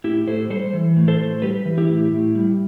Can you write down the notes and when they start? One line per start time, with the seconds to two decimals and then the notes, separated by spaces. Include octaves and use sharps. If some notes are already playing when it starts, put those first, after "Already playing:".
0.04 A2 E4 G4
0.27 A2 A4 C5
0.50 G3 A4 C5
0.73 E3
0.96 A2
1.08 A4 C5
1.20 A2
1.42 G3 G4 B4
1.65 E3
1.78 E4 G4
1.89 A2
2.12 A2
2.35 G3